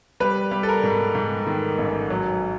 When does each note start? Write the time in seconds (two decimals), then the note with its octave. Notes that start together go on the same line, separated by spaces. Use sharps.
0.20 G3 B4
0.51 G3
0.63 A4
0.68 A#4
0.83 G#2
1.15 G#2
1.47 D#3
1.78 A1
2.10 F#3